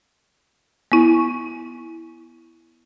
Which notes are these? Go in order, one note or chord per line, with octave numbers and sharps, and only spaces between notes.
B3 E4